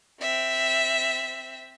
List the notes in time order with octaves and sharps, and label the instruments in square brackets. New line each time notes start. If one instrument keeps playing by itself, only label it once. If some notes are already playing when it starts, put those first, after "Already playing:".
[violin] C4 E5